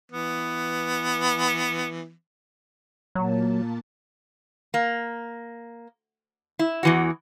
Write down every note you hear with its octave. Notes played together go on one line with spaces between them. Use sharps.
E3 B3
A#2 F#3 A#3 A5
A#3
E4
E2 E3 F#4